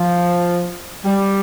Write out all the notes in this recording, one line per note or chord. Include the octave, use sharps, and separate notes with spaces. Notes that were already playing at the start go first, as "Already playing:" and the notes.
Already playing: F3
G3